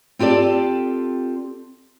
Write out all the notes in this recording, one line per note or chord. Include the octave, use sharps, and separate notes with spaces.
C4 F4 G4 A4 D5